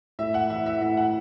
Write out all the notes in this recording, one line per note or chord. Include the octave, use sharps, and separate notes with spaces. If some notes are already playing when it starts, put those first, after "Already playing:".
A2 E5
F#5
E3 E5
E5
A2 E5
F#5